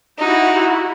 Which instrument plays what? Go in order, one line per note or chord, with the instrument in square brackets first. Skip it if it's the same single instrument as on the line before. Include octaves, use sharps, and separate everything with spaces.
[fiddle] D#4 [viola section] E4 F#4 G4